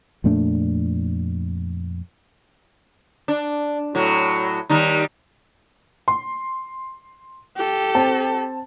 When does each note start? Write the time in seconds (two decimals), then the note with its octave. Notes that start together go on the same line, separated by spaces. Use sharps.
0.24 F2 A#2 A3 D4
3.28 D4
3.95 A2 F#3
4.70 D#2 G3 D#4
6.08 C6
7.56 G4 A4
7.95 C4 A5